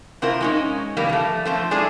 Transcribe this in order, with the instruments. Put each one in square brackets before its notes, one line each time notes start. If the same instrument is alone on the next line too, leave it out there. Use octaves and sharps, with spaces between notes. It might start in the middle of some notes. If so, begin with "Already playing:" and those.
[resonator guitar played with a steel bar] C3 C4 E4 F4 A#4
G#3 C#4 D#4
C#3 E3 G3 A#3 B3
F3 A3
F3 A3 C4
G#3 D4 E4 G#4 A4 D5